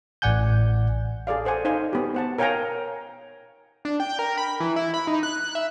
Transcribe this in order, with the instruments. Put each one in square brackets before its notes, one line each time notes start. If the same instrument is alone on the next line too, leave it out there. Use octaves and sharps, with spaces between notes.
[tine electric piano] A1 A2 D5 F#5 G#5 G6
[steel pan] G#4 A4 D5 F5
A4 C5 F#5 G#5
D#4 C5 F5 G#5
B3 G4
C5 F#5 A5
A#4 C#5 F5 G5 G#5 A#5
[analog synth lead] D4
G5
A#4
B5
E3
E4
B5
D#4
F#6
F#6
E5